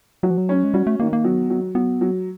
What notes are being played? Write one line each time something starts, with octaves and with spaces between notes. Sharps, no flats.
F#3 F#4
F3
F#3
C#4
G#3
G3 F#4
A3
D#3 A#3
A#3
F#3 B3
F#3
F#3 B3
F#3